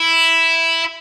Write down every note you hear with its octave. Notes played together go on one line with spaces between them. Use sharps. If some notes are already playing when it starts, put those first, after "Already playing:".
Already playing: E4